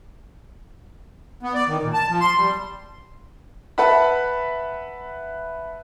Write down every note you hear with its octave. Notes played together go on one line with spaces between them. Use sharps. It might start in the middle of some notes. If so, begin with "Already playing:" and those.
B3
D5
D#3
A#2
A5
F3
C6
G3
B4 E5 F#5 A5 B5